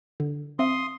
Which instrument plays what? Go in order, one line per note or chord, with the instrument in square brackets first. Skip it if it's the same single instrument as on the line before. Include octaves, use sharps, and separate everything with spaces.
[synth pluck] D3
[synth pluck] C4 E5 F5 [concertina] C6 D#6